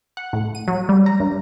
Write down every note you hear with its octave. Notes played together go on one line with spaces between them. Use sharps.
F#5
A2
D#7
F#3
G3
A#5
G2